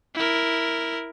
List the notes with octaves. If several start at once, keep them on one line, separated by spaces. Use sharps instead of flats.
E4 A#4